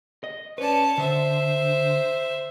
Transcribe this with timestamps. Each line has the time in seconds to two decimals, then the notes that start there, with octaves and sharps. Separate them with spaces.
0.24 D#5
0.58 C#4 B4 D5 A5
0.98 D3 C5 E5